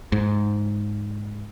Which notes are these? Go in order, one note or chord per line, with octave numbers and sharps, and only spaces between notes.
G#2